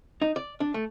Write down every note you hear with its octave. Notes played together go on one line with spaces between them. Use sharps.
D#4
D5
D4
A3